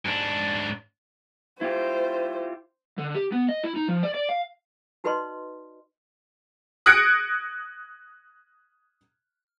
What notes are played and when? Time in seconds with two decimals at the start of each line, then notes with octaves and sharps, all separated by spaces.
0.06 G#2 D4
1.61 E4 F4 G4 C5
2.98 D3
3.15 G4
3.32 B3
3.49 D#5
3.63 E4
3.76 D#4
3.88 F3
4.03 D5
4.14 D5
4.29 F5
5.04 D#4 F#4 B4 D5 D#5 C6
6.86 D#6 F#6 G#6 A#6 C#7 D7